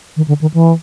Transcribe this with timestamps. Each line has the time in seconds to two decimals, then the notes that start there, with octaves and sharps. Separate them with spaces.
0.17 D#3
0.28 D3
0.41 D#3
0.54 E3